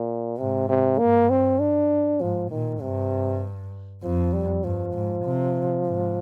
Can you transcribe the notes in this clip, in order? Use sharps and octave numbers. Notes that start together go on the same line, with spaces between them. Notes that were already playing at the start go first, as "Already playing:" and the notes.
Already playing: A#2
G#2 C3
C3
G2 A#3
C4
D4
G#2 F3
A#2 D#3
G2 C3
F2 F3
G3
G2 F3
G#2
C3
G#2